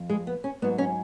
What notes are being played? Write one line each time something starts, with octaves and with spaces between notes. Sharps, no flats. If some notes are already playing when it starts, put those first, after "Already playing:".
Already playing: F2 F3
G#3
B3
C#4
G#2 F#3 B3
C#4